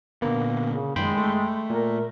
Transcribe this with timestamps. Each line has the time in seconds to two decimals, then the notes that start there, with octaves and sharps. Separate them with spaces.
0.22 A#2 D3 A#3 B3
0.68 C#3
0.96 F#2 D#3 G#3 G5 B5 C6
1.17 A3
1.70 A#2 A#4